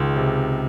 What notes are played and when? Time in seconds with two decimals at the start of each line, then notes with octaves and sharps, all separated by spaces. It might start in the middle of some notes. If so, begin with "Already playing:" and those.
Already playing: C#2 D#3 G#3
0.16 C3